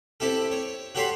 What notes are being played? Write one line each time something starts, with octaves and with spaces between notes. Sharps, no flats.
C4 E4 G4 A4
C#5
F#4 G4 A4 C#5 B5 C6